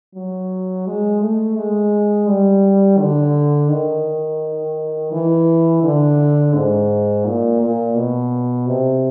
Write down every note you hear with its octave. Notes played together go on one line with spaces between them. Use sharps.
F#3
G#3
A3
G#3
G3
D3
D#3
E3
D3
G#2
A#2
A#2
B2
C3